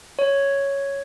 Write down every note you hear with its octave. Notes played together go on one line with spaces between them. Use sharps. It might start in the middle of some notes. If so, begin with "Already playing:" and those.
C#5